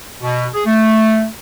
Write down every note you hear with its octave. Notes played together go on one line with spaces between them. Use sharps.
B2
G#4
A3